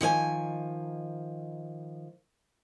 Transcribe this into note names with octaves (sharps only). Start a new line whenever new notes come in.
D#3 F3 D5 G#5